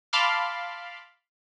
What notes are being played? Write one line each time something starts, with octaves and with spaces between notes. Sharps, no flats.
F5 A5 B5 C6 D6 F6